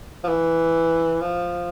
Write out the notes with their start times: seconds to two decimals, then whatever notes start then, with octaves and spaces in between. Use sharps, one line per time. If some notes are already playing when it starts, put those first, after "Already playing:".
0.24 F3
0.28 E3
1.21 F3